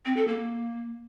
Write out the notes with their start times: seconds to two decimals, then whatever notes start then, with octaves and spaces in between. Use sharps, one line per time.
0.05 C4
0.16 A4
0.28 A#3